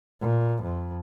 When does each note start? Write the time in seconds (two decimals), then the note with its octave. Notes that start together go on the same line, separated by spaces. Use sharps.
0.21 A#2
0.63 F2